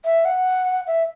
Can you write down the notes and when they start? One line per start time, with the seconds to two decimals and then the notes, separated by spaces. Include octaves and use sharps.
0.05 E5
0.25 F#5
0.87 E5